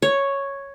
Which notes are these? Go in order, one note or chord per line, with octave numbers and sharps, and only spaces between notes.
C#5